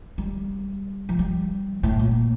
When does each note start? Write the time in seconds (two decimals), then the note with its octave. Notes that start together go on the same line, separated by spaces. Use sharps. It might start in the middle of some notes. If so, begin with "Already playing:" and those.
0.18 G3
1.09 F3
1.19 G3
1.83 A2
1.99 A#2